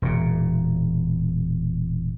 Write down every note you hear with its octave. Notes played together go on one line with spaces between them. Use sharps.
E1 A#2